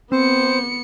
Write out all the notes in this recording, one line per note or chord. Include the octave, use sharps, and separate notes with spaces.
B3 C4 C5 C#7